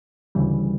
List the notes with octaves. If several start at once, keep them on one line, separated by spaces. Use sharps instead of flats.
D2 C#3 E3 G3